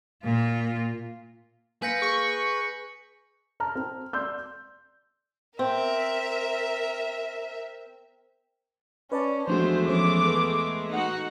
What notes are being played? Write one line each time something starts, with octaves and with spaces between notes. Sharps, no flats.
A#2 F4
A#3 B4 F5 G#5 G6 A#6 C#7
G#4 C#6
A5 A#5 F6
C4
D5 C6 E6 G6
C4 A#4 E5
C#4 B4 D5 A5
E2 F3 G#3 A3 D4 F#4 C5
F3 C#4 C5 D6
A4 B4
D#4 F#4 F#5